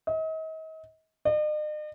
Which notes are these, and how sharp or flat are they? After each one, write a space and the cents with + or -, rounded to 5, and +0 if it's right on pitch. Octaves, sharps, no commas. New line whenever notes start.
D#5 +40
D#5 -45